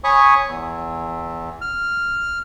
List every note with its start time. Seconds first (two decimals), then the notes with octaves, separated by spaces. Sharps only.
0.04 C#5 G#5 B5 C#6 D#6
0.47 E2
1.61 F6